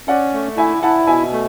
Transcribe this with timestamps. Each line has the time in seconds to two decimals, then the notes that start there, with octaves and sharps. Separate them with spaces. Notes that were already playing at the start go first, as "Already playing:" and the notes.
0.08 C#4 D5 F#5
0.33 A3
0.57 E4 E5 G#5
0.83 E4 F#5 A5
1.07 B2 E5 G#5
1.33 A3